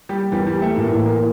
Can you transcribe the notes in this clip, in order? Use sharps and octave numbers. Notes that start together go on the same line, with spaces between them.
G3 G4
E2 E3 G3 G4
G3 G4
A3 A4
A2 E3 A#3 A#4
A#3 A#4